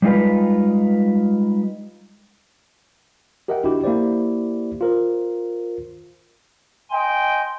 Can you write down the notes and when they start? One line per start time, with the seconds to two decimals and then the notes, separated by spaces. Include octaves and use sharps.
0.02 G3 G#3 D#4 F4 B4
3.48 G4 A#4 D#5 E5 F#5 G5
3.64 D4 E4 F#4 G4
3.84 A#3 E4 G4 C5 D5
4.81 F4 A#4 C5
6.91 D#5 G5 G#5 C6